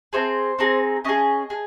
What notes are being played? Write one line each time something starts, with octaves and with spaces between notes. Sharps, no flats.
C4 D#4 G#4 C5
C4 D#4 G#4
C#4 G#4 D#5
G#4